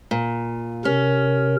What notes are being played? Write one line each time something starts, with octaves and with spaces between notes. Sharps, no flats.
A#2
C3 C#4 A#4